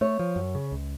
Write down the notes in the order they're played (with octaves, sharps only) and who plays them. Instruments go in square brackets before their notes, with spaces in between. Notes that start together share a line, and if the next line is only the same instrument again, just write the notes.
[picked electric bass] A3 [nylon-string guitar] C#5
[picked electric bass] F3
F#2
C#3
C#2